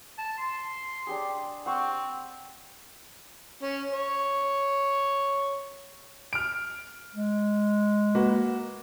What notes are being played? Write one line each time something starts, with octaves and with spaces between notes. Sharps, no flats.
A5
C6
D4 G4 G#4
C4 F#5 G5 C#6
C#4
C#5
F6 D7
G#3
A#3 F#4 B4